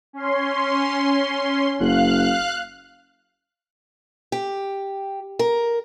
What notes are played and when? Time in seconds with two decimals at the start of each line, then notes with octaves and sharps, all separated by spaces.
0.13 C#4 C6
1.80 F#1 F5 F#6
4.32 G4
5.39 A#4